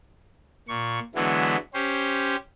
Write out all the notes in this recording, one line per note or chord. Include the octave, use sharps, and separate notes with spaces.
A#2 C#6
D3 E3 F#3 G#3 B3 E4
C#4 G4 C5